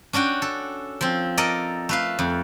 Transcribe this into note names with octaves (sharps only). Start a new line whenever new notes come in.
C#4 D4 F#4 G5
A4
F3 C4
A4 A#4 D5 D#5
A3 B4 F5
F2